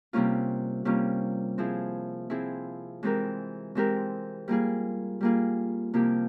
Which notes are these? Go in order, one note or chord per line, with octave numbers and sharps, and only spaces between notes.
C3 G3 A#3 C#4 F4
C3 G3 A#3 C#4 F4
F3 C4 E4 G#4
F3 C4 E4 G#4
E3 G#3 C4 G4 A#4
E3 G#3 C4 G4 A#4
G3 A#3 F4 G#4
G3 A#3 F4 G#4
C3 F3 A#3 E4 G4